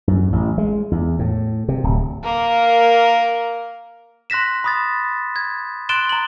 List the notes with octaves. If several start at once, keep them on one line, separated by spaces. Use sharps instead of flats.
F#2
A1
G#3
E2
A2
C3
D1
A#3 A#4
C6 F#6 A#6 B6 E7
B5 D#6 A6
G#6
C6 F#6 A6 D7 E7 G7
A#5 F#7